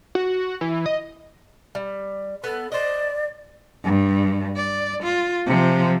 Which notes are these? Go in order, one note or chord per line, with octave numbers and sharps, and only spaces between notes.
F#4
E3
D#5
G3
B3 A4
C5 D5 D#5
G2
D5
F4
C3 F3